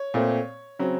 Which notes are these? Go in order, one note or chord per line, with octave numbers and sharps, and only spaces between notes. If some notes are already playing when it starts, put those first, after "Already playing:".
Already playing: C#5
A#2 A3 C4
C#3 F#3 C4